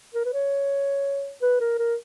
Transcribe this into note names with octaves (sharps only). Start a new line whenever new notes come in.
A#4
B4
C#5
B4
A#4
A#4